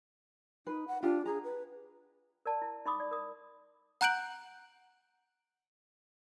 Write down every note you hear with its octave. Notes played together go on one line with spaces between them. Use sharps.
D#4 B4
F#5
D4 F4 G4
G#4 A#5
B4
A#4 D5 A5
E4
D#4 D#5 B5 C6 D6 D#6
D5
A#4 D#6
F#5 A#5 F#6 G6 D7 F#7